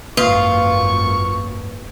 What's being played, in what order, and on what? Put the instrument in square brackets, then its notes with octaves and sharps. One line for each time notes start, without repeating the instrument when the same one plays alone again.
[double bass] G#1 F#2 [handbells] A#3 B4 [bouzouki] F4 [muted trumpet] C#6